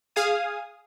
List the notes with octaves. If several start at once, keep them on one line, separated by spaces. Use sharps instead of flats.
G#4 F5 G#5 D#6